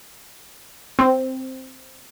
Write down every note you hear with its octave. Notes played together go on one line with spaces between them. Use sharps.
C4